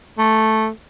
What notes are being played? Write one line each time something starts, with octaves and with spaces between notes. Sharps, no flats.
A3